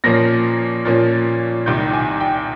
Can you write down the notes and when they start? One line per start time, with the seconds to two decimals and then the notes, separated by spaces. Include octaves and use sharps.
0.04 A#2 F3 A#3 C#4 A#6
0.85 A#2 F3 A#3 C#4
1.66 C2 C3 D#3 G6
1.93 G#5
2.20 G5